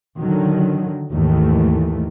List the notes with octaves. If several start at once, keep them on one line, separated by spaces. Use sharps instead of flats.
D3 D#3 F#3
D#2 G#2 D#3 E3 A3